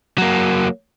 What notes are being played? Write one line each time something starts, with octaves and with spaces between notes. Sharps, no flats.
F#3 A#3